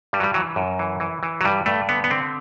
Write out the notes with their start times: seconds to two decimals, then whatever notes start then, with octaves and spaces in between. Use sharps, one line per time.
0.13 G2 G3
0.20 F#3
0.23 G3
0.34 E3 F#3
0.56 F#2
0.79 E3
1.00 E3
1.23 E3
1.41 F#3
1.45 G2 G3
1.66 G2 A3
1.89 D3 B3
2.04 B3
2.10 D3 C4